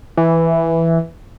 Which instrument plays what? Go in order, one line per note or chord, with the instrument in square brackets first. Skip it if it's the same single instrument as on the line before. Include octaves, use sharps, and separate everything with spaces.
[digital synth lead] E3